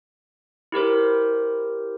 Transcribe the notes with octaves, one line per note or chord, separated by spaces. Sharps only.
E4 G4 A#4 C5